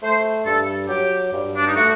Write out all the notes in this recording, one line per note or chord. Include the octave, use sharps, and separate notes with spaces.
A3 C5
G2 A4
F#3 G4
G2
D4
D#4
A3 F#4